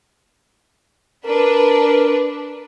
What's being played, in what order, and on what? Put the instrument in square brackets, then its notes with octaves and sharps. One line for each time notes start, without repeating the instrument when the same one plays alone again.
[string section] D4 B4 [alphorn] A#4